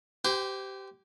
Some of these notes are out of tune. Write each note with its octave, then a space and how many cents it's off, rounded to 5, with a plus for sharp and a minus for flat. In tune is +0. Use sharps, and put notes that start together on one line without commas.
G4 -15 C5 -30 G5 +40